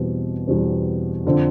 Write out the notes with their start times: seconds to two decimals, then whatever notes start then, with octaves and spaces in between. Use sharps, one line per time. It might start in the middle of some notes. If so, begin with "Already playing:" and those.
Already playing: E2 B2 G3 C4
0.47 E2 B2 G3 C4
1.25 F2 D3 F3 C4